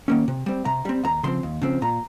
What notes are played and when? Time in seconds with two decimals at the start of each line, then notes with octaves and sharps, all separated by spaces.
0.08 D#3 A#3 C#4
0.28 C3
0.46 G3 C4
0.65 C3 A#5
0.85 G3 C4
1.04 D#2 A#5
1.23 C#3 F3 C4 C6
1.43 D#2
1.62 C#3 F3 C4
1.82 A#2 A#5